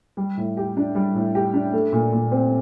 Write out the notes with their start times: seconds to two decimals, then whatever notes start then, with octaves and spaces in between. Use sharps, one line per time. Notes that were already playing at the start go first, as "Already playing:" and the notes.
0.17 G3
0.37 A2
0.57 G4
0.77 D4
0.95 G3
1.15 A2
1.35 G4
1.53 D4
1.73 A3
1.93 A#2
2.13 A#2
2.32 C4